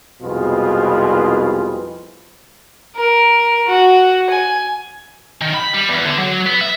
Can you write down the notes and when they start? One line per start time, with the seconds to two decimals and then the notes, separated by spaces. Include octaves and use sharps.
0.22 C2 F2 B2 G#3 F4 B4
2.96 A#4
3.67 F#4
4.30 G#5
5.41 D#3
5.54 B5
5.74 G3
5.89 E2
6.05 D3
6.18 F#3
6.47 B3
6.61 E5